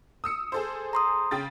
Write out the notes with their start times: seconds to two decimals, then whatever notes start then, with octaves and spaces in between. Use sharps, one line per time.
0.24 D#6 E6 C#7
0.52 G#4 A4 C5
0.93 A#5 C6 D#6
1.31 C#3 G5 A6